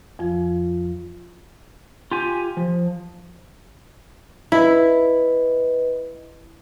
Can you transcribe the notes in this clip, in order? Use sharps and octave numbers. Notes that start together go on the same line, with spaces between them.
F2 F3 F4
F4 G4 G#5
F3
E4 B4 D#5